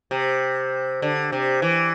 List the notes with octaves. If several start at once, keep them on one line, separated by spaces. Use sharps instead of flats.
C3
D3
C3
E3